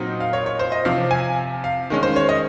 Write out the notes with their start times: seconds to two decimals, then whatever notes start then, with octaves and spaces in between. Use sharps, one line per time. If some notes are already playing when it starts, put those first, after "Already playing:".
Already playing: A#2 F#3 C4 D#4
0.20 F5
0.33 C#5
0.46 C#5
0.59 C5
0.72 D#5
0.85 C3 F3 C4 F5
1.11 G#5
1.64 F5
1.90 D#3 G#3 C#4
2.03 C5
2.16 C#5
2.29 D#5